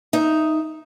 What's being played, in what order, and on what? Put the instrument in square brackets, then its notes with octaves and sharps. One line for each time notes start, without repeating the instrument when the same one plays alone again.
[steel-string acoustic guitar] D#4 E5